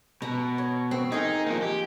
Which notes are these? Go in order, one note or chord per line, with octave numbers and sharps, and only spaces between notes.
B2 A#5
C#5
C4
D#4 G#4 A#4
F3 A#3
G4